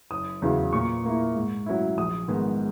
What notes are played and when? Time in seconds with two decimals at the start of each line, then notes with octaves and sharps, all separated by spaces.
0.11 F#1 D#6
0.42 E2 C#3 F#3
0.73 A#2 C#6
1.05 A#3 E4
1.36 G#2
1.66 F#3 C#4 E4
1.97 A#1 D#6
2.28 G#2 D#3 G#3 B3